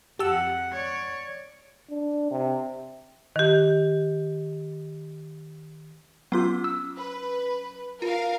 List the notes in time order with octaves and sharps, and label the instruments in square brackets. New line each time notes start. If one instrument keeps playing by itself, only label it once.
[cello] F2 F#5 [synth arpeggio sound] G4 A5 E6
[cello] C#5 D5
[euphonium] D4
C3
[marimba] D#3 G4
[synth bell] F#3 C#4 D6 [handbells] B3 F4
[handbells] E6
[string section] B4
[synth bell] F4 [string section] A#4 F5